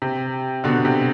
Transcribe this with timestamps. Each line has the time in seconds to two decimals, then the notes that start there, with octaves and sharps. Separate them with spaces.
0.02 C3
0.64 B2 D3
0.85 C3